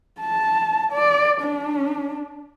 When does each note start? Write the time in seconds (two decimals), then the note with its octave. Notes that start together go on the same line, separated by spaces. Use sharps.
0.20 A5
0.92 D5
1.42 D4